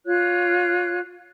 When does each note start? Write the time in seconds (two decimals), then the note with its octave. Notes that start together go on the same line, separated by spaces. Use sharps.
0.05 F4 C#5 F#6